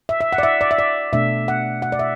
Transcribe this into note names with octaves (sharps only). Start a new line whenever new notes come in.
E5
E5
F#5
D5
E5
D5
E5
D5
B2 A3 D4 E5
F#5
F#5
D5
E5